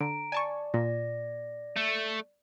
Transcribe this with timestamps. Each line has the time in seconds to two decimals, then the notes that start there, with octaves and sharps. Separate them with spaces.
0.01 D3 A#5 D7
0.32 D5 G#5 A5 C#6
0.74 A#2 D5 A#6
1.76 A3